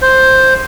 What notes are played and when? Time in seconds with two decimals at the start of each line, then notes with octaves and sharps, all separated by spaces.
0.02 C5